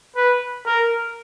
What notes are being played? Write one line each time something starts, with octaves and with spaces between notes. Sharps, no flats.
B4
A#4